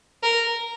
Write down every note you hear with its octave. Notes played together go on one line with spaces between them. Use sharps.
A#4